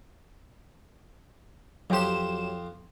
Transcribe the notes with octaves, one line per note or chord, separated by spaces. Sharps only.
F2 F#3 G4 C5 E7